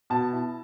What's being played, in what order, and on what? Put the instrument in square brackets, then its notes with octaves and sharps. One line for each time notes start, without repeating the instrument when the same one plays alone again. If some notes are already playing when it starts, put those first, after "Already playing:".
[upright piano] B2 A5
E4